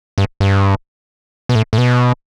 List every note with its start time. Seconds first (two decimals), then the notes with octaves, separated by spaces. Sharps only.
0.18 G2
0.40 G2
1.49 B2
1.55 A2
1.73 A2
1.78 B2